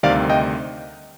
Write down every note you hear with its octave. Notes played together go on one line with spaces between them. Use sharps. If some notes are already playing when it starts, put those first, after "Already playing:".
D2 C3 D#3 G3 C4 D5 F5
D#5 G5